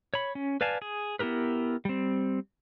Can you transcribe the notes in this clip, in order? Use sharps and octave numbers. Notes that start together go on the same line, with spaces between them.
C#5 B5
C#4
B4 D5 F5 G#5 A5
G#4
B3 E4 G4 A#4 B4
G3 C4